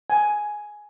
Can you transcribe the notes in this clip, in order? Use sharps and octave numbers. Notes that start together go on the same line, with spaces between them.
G#5